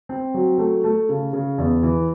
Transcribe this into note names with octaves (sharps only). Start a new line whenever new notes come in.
C4
F#3
A3
A3
C#3
C#3
E2
E3